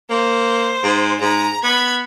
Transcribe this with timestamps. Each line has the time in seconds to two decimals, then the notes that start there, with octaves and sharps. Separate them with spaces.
0.10 A#3 C5
0.83 G#2
1.21 G#2 A#5
1.63 B3 B5 G#6